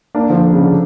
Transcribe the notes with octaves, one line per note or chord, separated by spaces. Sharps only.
A#3 D4
D3 F3
C#3
D3